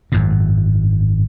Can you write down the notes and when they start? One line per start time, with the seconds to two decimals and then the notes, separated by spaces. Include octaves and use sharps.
0.12 G#1 F#2 A2